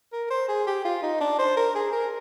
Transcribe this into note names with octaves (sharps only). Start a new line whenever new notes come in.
A#4
C5
G#4
G4
F4
D#4
D4
C5
A#4
G#4
A#4